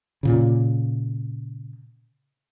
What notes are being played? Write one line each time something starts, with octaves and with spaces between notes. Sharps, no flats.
A#2 C#3